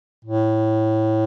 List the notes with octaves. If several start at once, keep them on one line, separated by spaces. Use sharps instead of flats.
A2